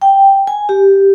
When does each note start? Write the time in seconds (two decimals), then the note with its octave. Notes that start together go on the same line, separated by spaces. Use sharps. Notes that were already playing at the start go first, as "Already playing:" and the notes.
0.02 G5
0.47 G#5
0.69 G4